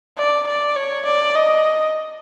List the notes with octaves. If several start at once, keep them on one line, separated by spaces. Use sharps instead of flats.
D5
D5
C#5
D5
D#5